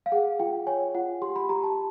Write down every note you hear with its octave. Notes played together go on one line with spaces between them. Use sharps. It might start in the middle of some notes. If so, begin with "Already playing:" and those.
F5
G#4 F#5
F4 G5
C#5 G#5
F4 F#5
G4 C6
B5
G4 A#5
A5